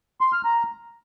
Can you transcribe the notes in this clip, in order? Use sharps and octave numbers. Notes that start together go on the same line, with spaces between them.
C6
F6
A#5